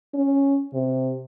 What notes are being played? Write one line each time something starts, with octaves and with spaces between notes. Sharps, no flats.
C#4
C3